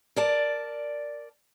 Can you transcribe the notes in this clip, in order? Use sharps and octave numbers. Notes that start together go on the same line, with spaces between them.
A#4 D5 A5